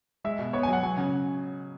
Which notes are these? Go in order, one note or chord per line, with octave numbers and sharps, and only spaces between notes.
G#3 E5
B2
B3 C#5
G#5
F#3 F#5
F#3 G#5
C#3